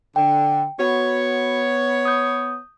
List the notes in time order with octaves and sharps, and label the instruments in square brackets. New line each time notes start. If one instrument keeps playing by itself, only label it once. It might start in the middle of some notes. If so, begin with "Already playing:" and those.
[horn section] D3 [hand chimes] G5
[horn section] B3 C#5 [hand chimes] F#4
[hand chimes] D#6 G6